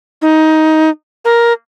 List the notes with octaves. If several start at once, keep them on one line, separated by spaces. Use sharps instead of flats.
D#4
A#4